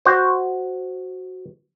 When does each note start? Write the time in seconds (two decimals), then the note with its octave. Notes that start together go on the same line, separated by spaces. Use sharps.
0.06 F#4 C5